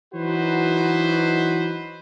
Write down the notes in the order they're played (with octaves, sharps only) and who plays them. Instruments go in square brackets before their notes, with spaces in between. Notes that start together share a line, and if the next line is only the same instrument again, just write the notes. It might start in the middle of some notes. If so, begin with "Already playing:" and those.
[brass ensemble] E3 F#3 D#4 F#4 B4 C5